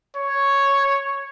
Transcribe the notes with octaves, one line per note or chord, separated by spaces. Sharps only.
C#5